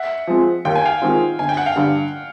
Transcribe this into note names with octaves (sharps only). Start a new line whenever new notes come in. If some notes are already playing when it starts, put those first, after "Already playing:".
Already playing: E5 F#5
F3 G#3 C4
D#2 G5
G#5
F5 G5
D#3 G#3 C4 F4
G1 G#5
G5
F#5
F5 G5
G2 D3